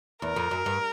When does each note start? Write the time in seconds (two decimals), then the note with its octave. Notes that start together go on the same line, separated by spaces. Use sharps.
0.22 E2 A#4
0.36 F2
0.51 F#2
0.66 G2